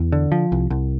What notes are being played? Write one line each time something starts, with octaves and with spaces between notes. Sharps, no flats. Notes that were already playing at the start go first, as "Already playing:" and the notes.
Already playing: E2
D3
F3
C2
C2